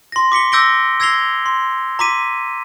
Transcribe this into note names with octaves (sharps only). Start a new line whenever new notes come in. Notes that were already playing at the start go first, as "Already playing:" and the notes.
C6 A#6
D6 B6 C#7 G7
D6 E6 G6 A#6 D7 G7
E6 G#6 A#6 C7 F7 G7
C6
A#5 C6 D6 B6 D#7